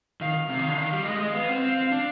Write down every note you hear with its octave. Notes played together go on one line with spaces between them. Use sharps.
D#3 F5
C3
D#3
D3
D#3
G3
G#3 D#5
G#3
B3 F5
C4
F5
D4